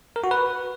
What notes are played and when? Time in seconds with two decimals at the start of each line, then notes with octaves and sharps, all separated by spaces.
0.16 A#4
0.24 F#4
0.31 B4